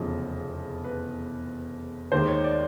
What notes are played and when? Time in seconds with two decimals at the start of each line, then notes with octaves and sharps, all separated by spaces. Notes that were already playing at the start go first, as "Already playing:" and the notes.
Already playing: F1 E2 C#3 F3
0.84 B4
2.12 D#2 D#3 G#3 C5
2.28 C#5
2.44 D5